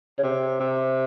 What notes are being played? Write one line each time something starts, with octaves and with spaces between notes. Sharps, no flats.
C#3
C3
C3